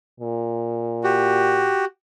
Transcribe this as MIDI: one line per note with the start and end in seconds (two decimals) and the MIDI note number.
0.20 1.75 46
1.04 1.85 66
1.04 1.85 67